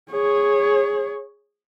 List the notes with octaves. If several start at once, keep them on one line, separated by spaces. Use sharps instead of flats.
G#4 C#5